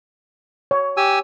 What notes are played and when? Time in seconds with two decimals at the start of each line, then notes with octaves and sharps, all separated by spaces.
0.71 C#5
0.97 G4 G#5 E6